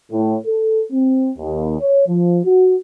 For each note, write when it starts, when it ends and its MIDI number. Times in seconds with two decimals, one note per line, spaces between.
0.12 0.37 45
0.47 0.83 69
0.92 1.31 60
1.38 1.79 39
1.80 2.07 73
2.08 2.40 53
2.45 2.76 66